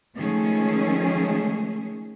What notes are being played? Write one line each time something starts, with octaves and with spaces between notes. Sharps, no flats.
D#3 F3 G#3 A3 C#4 G#4